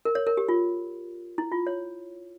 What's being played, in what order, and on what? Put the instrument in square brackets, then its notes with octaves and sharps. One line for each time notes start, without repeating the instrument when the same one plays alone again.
[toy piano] A#4
C#5
A#4
G4
F4
E4
F4
C#5